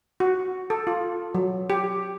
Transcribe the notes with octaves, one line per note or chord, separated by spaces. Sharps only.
F#4
A4
F4
F#3
G4